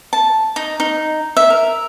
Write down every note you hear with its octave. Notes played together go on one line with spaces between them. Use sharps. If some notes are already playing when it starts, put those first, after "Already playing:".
A5
D#4
D#4
E5
A#4